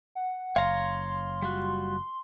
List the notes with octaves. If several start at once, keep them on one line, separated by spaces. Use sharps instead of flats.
F#5
F#1 C#5 F5 A#5 C6
G3 F4 F#4